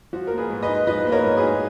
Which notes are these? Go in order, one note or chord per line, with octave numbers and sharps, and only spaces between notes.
F3 F#4
A#3 A#4
G#4 B4
G#2
B4 D#5
D#4
F3 B4 D#5
A#3 B4
A#4 C#5
G#2
G#4 B4
D#4